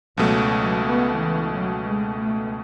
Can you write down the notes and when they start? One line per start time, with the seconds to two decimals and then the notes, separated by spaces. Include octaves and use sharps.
0.17 C#2 B2 F#3 A3
0.85 B3
1.19 E3
1.53 F#3
1.86 G#3
2.20 A3